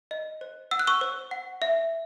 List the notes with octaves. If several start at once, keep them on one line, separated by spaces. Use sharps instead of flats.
D#5
C5
F#5 E6
F#6
C#6 E6
C5
F#5
E5